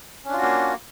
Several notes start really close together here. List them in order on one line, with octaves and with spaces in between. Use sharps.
C#4 D4 F4 F#4 A#3